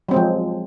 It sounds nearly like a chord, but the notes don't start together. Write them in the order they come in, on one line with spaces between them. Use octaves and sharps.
F#3 C4 G#3 F3